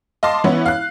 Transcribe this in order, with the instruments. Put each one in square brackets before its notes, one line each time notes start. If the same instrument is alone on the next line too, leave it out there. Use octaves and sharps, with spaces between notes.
[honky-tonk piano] D#5 F5 A5 C6 D6
E3 B3 C#4 E4
F5 F#6